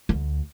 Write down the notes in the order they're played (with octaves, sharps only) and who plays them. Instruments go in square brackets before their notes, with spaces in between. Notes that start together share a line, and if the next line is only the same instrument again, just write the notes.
[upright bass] D2